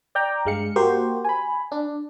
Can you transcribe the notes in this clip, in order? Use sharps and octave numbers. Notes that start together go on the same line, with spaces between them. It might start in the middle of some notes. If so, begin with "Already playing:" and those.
D5 G5 A#5
G2 G#3 F5 C#7
A#3 F#4 G4 C5
G#5 B5
D4